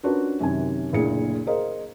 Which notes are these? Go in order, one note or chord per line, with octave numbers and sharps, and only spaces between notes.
C#4 D4 F4 F#4 A#4 B4
F#2 C3 D#3 G#5
F#1 D2 A#2 E4 G#4 C#7
G#4 A#4 C5 D#5 F5